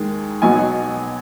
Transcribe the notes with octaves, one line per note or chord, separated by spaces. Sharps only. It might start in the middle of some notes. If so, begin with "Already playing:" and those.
Already playing: D#2 D#3 G#3
B1 B2 F#3 G#5